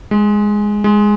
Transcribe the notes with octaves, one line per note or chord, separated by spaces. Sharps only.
G#3
G#3